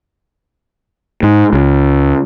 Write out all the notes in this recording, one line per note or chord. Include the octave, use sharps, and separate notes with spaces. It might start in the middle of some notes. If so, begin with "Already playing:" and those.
G#2
C#2